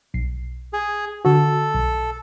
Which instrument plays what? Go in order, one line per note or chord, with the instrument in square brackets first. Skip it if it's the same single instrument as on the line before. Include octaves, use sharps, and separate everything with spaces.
[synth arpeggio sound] B1 C7
[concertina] G#4
[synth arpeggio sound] D3 F#4 [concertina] A4
[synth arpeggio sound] B1